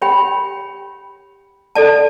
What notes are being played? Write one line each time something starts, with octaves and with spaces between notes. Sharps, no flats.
G4 C#5 G5 B5
A4 D5 A5